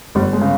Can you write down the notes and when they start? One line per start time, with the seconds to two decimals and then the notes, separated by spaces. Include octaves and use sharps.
0.15 G1 G3
0.33 G#3
0.41 C#3